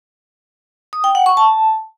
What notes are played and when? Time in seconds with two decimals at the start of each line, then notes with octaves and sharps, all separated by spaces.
0.93 D#6
1.04 G5
1.15 F#5
1.26 C#6
1.37 A5